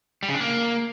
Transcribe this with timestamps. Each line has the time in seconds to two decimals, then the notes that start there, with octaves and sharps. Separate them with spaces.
0.23 G3
0.29 C#3
0.35 D4
0.40 A#3